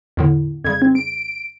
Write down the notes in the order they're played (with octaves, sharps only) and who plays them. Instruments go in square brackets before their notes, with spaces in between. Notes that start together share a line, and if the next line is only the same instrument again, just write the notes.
[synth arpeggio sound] E2 A2 D3
[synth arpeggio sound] F2 C#3 G3 [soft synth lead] G#6
[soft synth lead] C4
D7